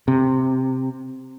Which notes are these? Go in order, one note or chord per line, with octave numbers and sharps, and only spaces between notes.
C3